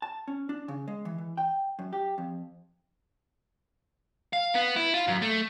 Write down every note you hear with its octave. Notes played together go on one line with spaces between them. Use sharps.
A5
C#4
D4
C#3
G#3
E3
E3
G5
F#2
G4
F2
F5
B3
E4
F4
F#2
A3